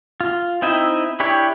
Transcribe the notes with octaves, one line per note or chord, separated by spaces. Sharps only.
F4
C4 D#4 E4 D#5 E5
D4 E4 G4 C#5